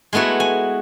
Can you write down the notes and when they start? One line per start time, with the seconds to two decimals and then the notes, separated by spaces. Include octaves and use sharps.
0.13 G#3 A3 B3 E4 F#4
0.40 G#5